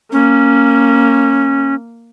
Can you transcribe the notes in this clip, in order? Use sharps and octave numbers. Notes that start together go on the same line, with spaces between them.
A#3 C#4